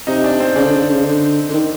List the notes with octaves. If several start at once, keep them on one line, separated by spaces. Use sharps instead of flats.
C3 D#4
D4
C4
C#3 D4
D3
C#3
D3
C#3
D3
D3
D#3